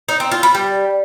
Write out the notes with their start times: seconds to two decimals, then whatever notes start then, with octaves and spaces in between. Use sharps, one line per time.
0.09 D#4
0.20 C4
0.32 F4
0.43 B4
0.55 G3